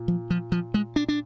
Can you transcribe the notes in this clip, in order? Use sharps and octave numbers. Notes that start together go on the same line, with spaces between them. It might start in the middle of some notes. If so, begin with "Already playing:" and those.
Already playing: A#2
F3
F3
F3
G#3
D4
D4